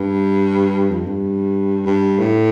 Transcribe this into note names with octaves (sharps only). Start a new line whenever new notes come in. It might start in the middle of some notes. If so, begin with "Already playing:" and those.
Already playing: G2
F2
G2
G2
A2